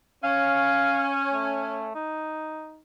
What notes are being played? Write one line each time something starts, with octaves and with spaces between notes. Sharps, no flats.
C#4 F5
A3
D#4